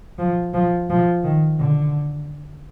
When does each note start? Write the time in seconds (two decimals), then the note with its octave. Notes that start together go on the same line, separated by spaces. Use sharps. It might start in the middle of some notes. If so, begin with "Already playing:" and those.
0.18 F3
0.54 F3
0.89 F3
1.24 D#3
1.59 D3